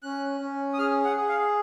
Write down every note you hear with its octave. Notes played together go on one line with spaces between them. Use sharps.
C#4 F#6
C#4
D#6
G#4 F6
F#5
G#4
F5